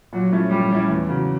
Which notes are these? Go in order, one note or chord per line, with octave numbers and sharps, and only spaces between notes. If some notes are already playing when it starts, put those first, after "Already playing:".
A#2 F#3
F3 A3 C#4 E4
A#2 G3
F3 A3 C#4 E4
E2
C#3 F#3